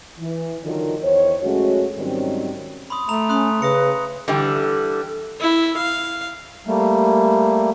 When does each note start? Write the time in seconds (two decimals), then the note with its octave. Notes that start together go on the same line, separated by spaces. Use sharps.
0.18 E3
0.64 D3 D#3 F#3 D#4 F4 A#4
1.02 E2 D#3 C5 C#5
1.43 F#2 G#3 A3 C#4 F#4
1.98 G#2 D#3 F#3 G3 C4 C#4
2.90 B5 C6 D#6
3.09 A3 A#5 F7
3.29 C#4 C6 D#6 F#6
3.62 C#3 B4 D#6 A#6 C#7
4.28 D3 E3 G3
5.40 E4
5.77 F5
6.67 G3 A3 A#3